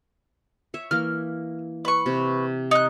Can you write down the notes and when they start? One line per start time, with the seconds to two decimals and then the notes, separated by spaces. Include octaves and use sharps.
0.74 C#5 E5
0.91 E3 A#3 F6
1.85 B4 C#6
2.06 C3
2.71 D#4 F#6